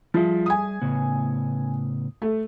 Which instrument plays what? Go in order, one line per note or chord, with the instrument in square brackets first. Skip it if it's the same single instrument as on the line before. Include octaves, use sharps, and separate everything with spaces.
[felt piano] F3 [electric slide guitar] G3 G#4 E5
[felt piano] G#5 D#6
[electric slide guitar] A2 C#3 B3
[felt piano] A3